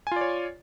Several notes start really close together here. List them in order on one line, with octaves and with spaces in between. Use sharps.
G#5 F4 D5 C#5